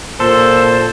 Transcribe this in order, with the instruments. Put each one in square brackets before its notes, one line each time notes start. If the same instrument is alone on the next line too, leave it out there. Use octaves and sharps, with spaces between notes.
[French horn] A#2 [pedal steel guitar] A4 [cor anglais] C5